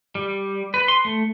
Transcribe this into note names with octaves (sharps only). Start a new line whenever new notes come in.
G3
B4
C6
A3